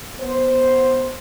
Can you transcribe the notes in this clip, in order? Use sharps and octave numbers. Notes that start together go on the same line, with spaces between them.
B3 C5